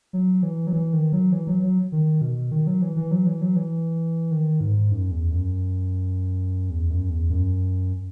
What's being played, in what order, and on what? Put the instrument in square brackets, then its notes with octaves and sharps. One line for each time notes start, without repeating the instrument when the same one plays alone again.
[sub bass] F#3
E3
F#3
E3
D#3
F#3
E3
F#3
F#3
D#3
B2
D#3
F#3
E3
E3
F#3
E3
F#3
E3
D#3
G#2
F#2
E2
F#2
E2
F#2
E2
F#2